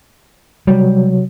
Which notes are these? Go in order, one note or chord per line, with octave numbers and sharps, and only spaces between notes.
C3 F#3 G3